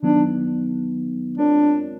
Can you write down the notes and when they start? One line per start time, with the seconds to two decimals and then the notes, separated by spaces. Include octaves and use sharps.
0.02 D#3 F#3 B3 D4 D#4
1.37 G#3 C4 D4 F4 A#4 C#5